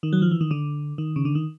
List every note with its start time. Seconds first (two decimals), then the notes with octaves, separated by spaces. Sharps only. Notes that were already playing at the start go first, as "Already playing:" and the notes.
0.03 D#3
0.13 F#3
0.22 F3
0.31 E3
0.41 D#3
0.51 D3
0.98 D#3
1.16 C#3
1.25 D3
1.35 D#3